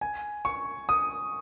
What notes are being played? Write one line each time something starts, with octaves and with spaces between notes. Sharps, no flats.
G#5
C#6
D#6